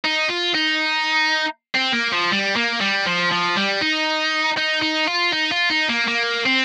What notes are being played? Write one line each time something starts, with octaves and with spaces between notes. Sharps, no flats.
D#4
F4
D#4
C4
A#3
F3
G3
A#3
G3
F3
F3
G3
D#4
D#4
D#4
F4
D#4
F4
D#4
A#3
A#3
C4